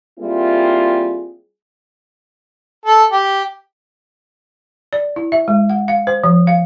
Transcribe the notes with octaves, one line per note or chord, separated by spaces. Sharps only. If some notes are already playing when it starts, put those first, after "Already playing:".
G3 A#3 C4 E4 F4 G#4
A4
G4
D5
E4
E5
G#3
F#5
F5
C5
F3
F5